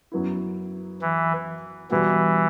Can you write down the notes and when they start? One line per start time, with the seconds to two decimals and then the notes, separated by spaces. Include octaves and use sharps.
0.12 F#2 F#3 B3 E4
1.01 E3
1.90 B2 E3 G3 B3 F#4